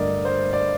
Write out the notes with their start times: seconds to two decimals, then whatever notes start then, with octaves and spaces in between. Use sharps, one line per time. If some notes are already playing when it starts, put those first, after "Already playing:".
Already playing: G2 D3 A3 A#4 D5 D#5
0.25 C5
0.53 D5